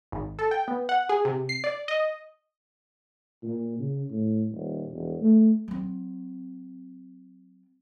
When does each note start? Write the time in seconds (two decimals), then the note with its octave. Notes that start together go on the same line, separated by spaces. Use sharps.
0.12 G#1
0.39 A4
0.51 G5
0.68 B3
0.89 F#5
1.09 G#4
1.25 C3
1.49 C7
1.64 D5
1.88 D#5
3.43 A#2
3.79 C#3
4.10 A2
4.51 D#1
4.91 E1
5.21 A3
5.68 F#3 C4